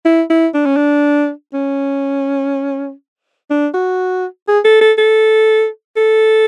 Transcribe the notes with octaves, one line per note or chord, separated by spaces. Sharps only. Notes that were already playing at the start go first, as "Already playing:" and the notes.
E4
E4
D4
C#4
D4
C#4
D4
F#4
G#4
A4
A4
A4
A4